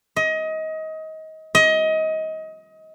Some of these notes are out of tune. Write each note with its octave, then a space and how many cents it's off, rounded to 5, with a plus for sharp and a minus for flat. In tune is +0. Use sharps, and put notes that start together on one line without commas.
D#5 +25
D#5 +25